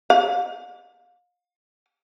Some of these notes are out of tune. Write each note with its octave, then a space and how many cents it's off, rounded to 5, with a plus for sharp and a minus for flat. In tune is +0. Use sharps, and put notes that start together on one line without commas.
F5 +35